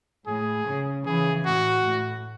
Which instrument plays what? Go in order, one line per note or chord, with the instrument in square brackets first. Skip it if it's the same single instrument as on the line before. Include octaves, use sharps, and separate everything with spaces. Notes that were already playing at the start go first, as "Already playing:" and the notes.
[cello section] A2 [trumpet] G#4
[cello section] C#3
[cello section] C#3 E3 [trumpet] G#4
[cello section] A2 [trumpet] F#4
[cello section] A2